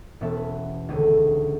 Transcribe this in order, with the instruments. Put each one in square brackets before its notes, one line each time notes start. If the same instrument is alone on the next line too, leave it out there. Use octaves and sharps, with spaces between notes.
[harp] E1 B2 B3 C#4 E5 A5
B4
D#1 C#2 D3 D#7